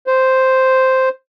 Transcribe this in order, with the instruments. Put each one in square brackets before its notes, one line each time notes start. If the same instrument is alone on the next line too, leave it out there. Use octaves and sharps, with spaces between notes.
[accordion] C5